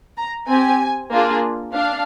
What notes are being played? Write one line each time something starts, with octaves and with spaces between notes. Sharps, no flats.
A#5
C4 G4 G#5
A#3 D4 F4 G#4
D4 F5